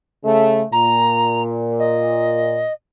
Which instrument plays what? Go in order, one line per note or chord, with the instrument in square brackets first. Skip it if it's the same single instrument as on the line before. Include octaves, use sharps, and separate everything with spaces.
[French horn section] C#3 A3
[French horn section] A#2 [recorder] A#5
[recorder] D#5